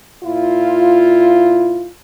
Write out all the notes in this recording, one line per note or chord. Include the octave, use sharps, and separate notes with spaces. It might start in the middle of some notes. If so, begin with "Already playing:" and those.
A#2 E4 F4